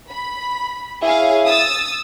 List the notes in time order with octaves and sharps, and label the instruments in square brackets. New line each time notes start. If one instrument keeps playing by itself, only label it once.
[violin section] B5
[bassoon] E4 [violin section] G#4 C#5 F5
[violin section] D#6 E6 A6